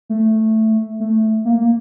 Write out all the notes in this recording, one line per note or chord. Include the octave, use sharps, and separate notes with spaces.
A3
A3
A#3
A#3